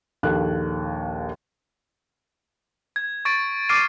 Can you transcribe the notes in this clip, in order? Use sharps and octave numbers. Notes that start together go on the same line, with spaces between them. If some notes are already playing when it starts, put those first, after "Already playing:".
A#1 D#2 A4 F#6
G#6
C#6 A6 D7
D6 F6 A6 C7 D7 D#7